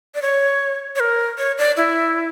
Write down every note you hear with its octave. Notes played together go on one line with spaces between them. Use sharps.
D5
C#5
C#5
A#4
C#5
D5
E4